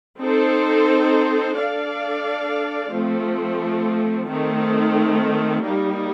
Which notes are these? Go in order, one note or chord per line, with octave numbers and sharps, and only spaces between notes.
C4 D#4 A4 C5
D4 A4 D5 F5
F3 A3 C4
D#3 A3 C4
G3 A#3 D#4